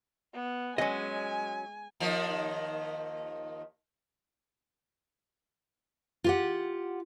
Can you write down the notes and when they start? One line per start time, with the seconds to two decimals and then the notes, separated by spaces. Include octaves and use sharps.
0.34 B3
0.78 F#3 G#3 C#4 D#5 G#5
2.00 D#2 D#3 F3
6.24 F4 G4 F#5